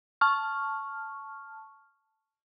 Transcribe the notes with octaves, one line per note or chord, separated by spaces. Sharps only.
A5 C#6 F6